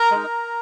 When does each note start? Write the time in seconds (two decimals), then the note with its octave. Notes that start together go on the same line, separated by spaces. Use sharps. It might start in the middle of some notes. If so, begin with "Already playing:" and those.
Already playing: A#4 A#5
0.11 G#3 D#4